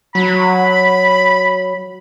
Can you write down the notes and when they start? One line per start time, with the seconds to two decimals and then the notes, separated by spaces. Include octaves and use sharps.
0.15 F#3 B5